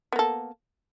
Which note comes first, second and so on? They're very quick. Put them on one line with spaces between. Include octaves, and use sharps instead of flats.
B3 A#3 A4